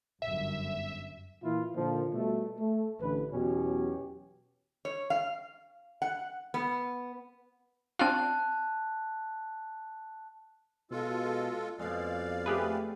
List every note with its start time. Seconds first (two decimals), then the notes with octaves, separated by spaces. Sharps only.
0.22 G1 F#2 E5
1.43 A#2 E3 E4 F4
1.75 A#2 D3 D#3 F3
2.13 B2 G3 A3
2.58 A3
3.00 A1 D3 E3 B4
3.32 E2 B2 F#3 C#4 G4
4.85 C#5
5.10 F5
6.02 F#5
6.54 B3
7.99 C4 D4 F4 A5 F#6
10.91 B2 G#3 F4 A4
11.79 F2 B2 G#3 D5 F5
12.46 A3 G4 G#4 B4